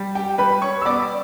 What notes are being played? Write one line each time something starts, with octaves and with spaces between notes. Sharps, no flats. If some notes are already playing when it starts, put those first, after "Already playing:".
Already playing: G3
G4 G5
G3 B4 B5
C#5 C#6
E6
B3 D5 D6